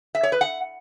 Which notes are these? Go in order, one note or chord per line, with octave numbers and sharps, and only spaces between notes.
E5
C#5
B4
F#5